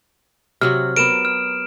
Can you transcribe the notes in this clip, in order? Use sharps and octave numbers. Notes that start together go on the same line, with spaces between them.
C3 F#3 F#4 F6
B3 A#4 D7 E7
F6